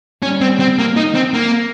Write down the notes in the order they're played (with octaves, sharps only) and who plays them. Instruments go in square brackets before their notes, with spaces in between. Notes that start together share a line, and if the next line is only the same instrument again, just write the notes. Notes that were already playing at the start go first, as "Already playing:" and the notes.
[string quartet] G3 [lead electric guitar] C#4
[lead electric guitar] C4
C4
A#3
D#4
C4
A#3